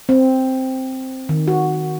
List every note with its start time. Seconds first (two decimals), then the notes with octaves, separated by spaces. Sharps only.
0.09 C4
1.29 D#3
1.48 F#4